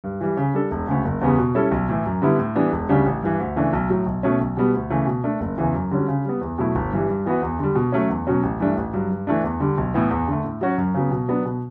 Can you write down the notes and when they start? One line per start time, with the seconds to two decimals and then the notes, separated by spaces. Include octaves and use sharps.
0.04 G2
0.21 E3 G3
0.37 C#3
0.54 G3 D4 A4
0.71 E1
0.87 D2 C#3
1.05 F#1
1.21 E2 C#3 G3 B3
1.38 B2
1.55 G3 C#4 E4 A4
1.71 B1
1.89 A2 E3
2.06 F#2
2.22 D3 G3 B3 E4
2.39 A2
2.55 E3 G3 B3 D4
2.72 E1
2.89 D2 C#3 G3 D4
3.06 A1
3.23 G2 E3
3.40 D2
3.56 C#3 E3 A3 D4
3.73 B1
3.90 A2 F#3
4.06 B1
4.23 B2 A3 C#4
4.40 B1
4.57 B2 G3 B3
4.74 D2
4.90 C#3 E3 A3
5.07 B2
5.24 A3 D4 A4
5.40 F#1
5.58 E2 C#3 E3
5.74 F#2
5.91 D3 G3 C#4 F#4
6.08 C#3
6.25 G3 B3
6.41 E2
6.58 B2 F#3 A3 E4
6.75 G1
6.92 G2 E3 G3
7.09 G2
7.26 E3 B3 F#4 B4
7.42 E2
7.59 D3 G3
7.75 B2
7.92 F#3 A3 C#4
8.10 E2
8.27 B2 F#3 C#4
8.43 A1
8.60 G2 E3 A3 D4
8.76 A1
8.93 G2 F#3
9.10 G2
9.27 E3 A3 D4
9.44 E2
9.60 D3 G3
9.78 B1
9.94 A2 E3 B3
10.11 E2
10.28 D3 A3
10.44 A2
10.61 F#3 C#4 F#4
10.78 F#2
10.94 C#3 F#3 B3
11.11 B2
11.28 F#3 B3 D4
11.45 B2